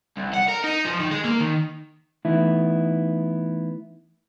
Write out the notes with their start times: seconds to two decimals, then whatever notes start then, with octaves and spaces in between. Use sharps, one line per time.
0.17 C2
0.34 F#5
0.48 A#4
0.64 D#4
0.85 F3
1.00 D#3
1.11 G#3
1.24 A#3
1.40 D#3
2.25 E3 A3 B3 D#4 E4